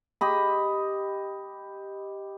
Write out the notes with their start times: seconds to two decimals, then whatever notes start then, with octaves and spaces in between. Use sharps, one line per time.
0.21 G4 D#5 B5